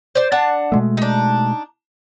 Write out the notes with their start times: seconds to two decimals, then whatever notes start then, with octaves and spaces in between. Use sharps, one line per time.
0.15 C5 D5
0.32 D4 F#5 A5
0.72 B2 G#3 A3
0.97 D4 D#4